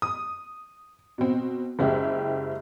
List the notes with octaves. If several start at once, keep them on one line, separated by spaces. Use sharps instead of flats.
D#6
B2 C4
F#1 G#3 E4 G4